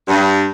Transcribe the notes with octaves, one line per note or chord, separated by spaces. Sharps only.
G2